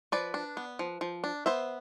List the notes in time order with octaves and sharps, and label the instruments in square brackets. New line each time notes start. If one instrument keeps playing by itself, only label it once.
[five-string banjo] F3 B4 D5
D4
B3
F3
F3
D4
B3 C5 E5